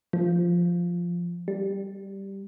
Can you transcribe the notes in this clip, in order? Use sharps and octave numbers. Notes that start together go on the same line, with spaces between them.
F3
G3